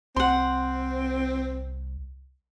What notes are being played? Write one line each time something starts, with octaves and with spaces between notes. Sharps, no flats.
C2 C4 F#5 C6